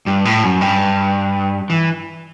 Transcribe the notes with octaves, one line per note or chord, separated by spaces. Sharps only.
G2
A2
F#2
G2
E3